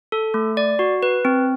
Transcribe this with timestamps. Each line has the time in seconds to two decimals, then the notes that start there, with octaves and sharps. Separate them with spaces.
0.12 A4
0.34 A3
0.57 D5
0.79 F#4
1.03 B4
1.25 C4